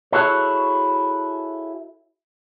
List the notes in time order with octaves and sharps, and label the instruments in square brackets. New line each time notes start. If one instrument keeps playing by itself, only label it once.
[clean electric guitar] E4 F#4 G#4 A4 C#5